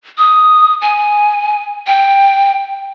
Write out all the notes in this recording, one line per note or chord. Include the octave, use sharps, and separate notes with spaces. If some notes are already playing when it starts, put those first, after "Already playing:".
D#6
G#5
G5